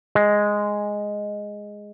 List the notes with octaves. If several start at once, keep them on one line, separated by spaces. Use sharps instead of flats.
G#3